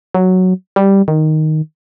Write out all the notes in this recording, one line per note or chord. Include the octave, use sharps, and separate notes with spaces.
F#3
G3
D#3